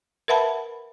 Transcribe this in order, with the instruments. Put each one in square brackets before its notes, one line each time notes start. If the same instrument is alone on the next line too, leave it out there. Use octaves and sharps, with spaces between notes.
[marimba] A#4 B4 E5 F#5 A5 B5